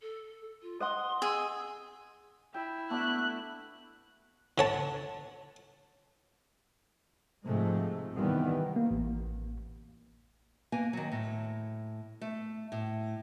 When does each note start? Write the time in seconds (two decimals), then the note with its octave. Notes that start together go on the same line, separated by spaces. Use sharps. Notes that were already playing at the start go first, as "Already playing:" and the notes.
0.01 A4
0.62 F4
0.80 D#5 F#5 C6 D#6
1.22 G#4 E6
2.54 E4 G5
2.90 A3 B3 D4 F#4 F#6
4.58 D3 C#5 A5
7.46 G#2 C3 F3 G#3 A3
8.14 C3 D#3 E3 G3 B3
8.76 A#3
8.91 A1
10.72 A#3 B3 G#5
10.93 D#3 F#3
11.12 A2
12.21 A3
12.72 A2